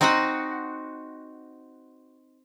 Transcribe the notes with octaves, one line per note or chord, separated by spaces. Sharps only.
C4 D#4 F#4 D#5 F#5